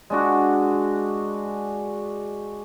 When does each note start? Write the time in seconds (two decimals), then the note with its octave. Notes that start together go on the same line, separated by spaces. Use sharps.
0.10 G#3 D4 F#4